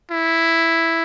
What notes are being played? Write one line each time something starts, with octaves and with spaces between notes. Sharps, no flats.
E4